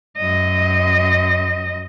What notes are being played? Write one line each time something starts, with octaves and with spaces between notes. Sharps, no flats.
F#2 D#5